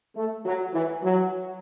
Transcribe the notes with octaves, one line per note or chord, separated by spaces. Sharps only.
A3
F#3
E3
F#3